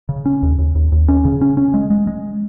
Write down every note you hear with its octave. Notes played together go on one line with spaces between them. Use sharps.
C#3
C#4
D#2
D#2
D#2
D#2
C#4
C#3
C#4
C#4
G#3
G#3
G#3